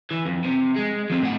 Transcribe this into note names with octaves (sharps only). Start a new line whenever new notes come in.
E3
F2
C3
G#3
F3 C4
A2 F#5